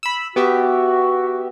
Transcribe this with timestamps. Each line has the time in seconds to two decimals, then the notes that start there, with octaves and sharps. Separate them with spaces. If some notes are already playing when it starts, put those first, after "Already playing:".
0.03 B5 E6
0.36 B3 F#4 G4 E5